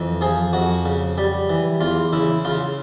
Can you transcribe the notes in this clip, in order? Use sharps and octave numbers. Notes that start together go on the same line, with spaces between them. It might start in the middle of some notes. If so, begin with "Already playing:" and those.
Already playing: F2 E3
F3 G#4
F2 F#4
C#3
G3
E3
E2 F4
C#3 E4
C#3 F4